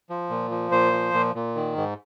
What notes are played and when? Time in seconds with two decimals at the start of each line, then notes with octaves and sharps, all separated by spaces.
0.10 F3
0.30 A#2
0.51 F3
0.71 A#2 C5
0.93 F3
1.14 A#2
1.35 A#2
1.55 D#3
1.77 G#2